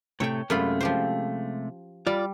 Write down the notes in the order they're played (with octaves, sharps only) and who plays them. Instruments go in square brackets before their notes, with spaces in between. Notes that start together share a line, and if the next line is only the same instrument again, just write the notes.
[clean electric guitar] A2 C3 A3 [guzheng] C#5 G5
[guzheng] F#2 F4 B5 [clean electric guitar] C3 G#3 A3
[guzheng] F3 G4 C5
[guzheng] G3 [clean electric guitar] F4 D5